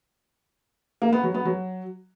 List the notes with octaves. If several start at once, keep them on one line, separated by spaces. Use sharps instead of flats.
A#3
B3
F#3
B3
F#3